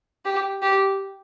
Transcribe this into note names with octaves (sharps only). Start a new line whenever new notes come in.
G4
G4